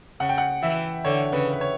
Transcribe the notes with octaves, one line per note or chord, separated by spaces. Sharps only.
C#3 F#5
G5
F#5
E3 E5
D3 C#5
C#3 B4
B4
C#5